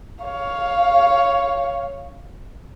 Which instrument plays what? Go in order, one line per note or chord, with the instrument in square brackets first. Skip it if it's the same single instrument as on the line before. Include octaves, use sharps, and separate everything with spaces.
[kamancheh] C#5 F5